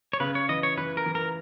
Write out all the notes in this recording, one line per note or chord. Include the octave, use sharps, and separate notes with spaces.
C#5
C#3 B4
C#5
E3 D#5
C#5
E3 B4
A#4
E3
A#4